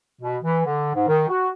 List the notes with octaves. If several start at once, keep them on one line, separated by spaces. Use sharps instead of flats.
B2
E3
D3
G#2
D#3
F#4